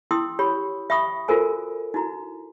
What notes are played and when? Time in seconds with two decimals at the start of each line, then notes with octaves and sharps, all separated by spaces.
0.11 E4 G5 C6 D#6 E6
0.39 G4 C#5 B5
0.90 E5 G5 B5 C#6 D#6
1.28 F4 F#4 A4 A#4 C5 G#5
1.94 D#4 E4 F#4 A#5